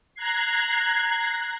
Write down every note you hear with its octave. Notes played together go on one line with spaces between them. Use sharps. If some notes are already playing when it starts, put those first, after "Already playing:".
A#5 F#6 G#6 C7